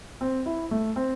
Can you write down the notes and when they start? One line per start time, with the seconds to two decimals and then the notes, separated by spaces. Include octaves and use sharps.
0.21 C4
0.46 E4
0.71 A3
0.96 C4